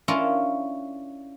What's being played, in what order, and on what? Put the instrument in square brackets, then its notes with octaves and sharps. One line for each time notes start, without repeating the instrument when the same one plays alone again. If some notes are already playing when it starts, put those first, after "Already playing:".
[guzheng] C#4 D4 E4 F4 A#4